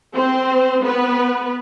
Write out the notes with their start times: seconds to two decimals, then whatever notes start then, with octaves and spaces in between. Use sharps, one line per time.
0.14 C4 C5
0.84 B3 B4